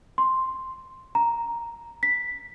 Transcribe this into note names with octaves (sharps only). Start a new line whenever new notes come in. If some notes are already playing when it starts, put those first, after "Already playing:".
C6
A#5
B6